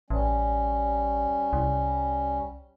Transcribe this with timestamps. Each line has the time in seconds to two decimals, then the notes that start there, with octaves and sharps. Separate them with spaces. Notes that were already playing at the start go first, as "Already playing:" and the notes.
0.10 A1 G3 C#4
1.53 C2